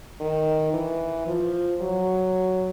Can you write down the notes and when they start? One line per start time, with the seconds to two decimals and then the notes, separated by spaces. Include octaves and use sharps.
0.20 D#3
0.73 E3
1.27 F3
1.81 F#3